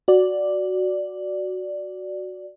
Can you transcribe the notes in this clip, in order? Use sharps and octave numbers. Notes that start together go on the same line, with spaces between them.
F#4 D5